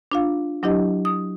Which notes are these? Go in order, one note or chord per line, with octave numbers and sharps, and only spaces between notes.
D4 F4 F5
F#3 D4 E4 G4 D#5
D#6